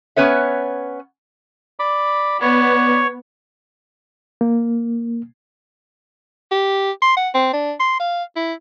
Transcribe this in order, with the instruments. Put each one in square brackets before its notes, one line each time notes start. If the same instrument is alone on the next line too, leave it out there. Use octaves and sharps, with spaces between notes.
[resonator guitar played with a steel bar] B3 C#4 B4 C#5 E5
[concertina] D5 B5 D6
[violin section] B3 [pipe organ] C#5 [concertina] D5
[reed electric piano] A#3
[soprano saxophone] G4
C6
F#5
C4
D4
C6
F5
E4